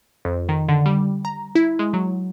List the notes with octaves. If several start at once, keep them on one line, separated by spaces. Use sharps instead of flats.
F2
D#3
D3
G3
A#5
E4
G#3
F#3